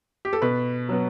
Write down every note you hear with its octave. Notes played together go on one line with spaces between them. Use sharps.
G4
A4
B2 B4
F#3 B3